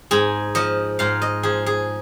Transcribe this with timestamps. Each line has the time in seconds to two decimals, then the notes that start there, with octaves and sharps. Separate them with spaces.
0.11 G#2 G#4
0.55 F3 D#5
0.99 G#2 F5
1.22 D#5
1.43 F3 G#4
1.66 G#4